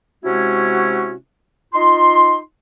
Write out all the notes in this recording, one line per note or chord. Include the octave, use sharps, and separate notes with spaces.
C3 G#3 C#4 E4 F#4
D#4 F4 C6